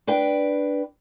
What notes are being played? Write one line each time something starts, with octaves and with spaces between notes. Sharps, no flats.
D4 B4 G5